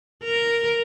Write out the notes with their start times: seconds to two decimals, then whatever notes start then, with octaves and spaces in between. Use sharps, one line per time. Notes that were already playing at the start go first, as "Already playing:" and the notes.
0.24 A#4